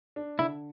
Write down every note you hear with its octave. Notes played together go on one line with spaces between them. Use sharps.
D4
D3 E4